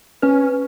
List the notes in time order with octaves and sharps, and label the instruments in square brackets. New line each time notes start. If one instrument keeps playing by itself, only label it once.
[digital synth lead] C#4 [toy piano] B4